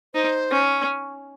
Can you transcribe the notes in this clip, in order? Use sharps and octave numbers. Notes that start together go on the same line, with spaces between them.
D#4 C5
C#4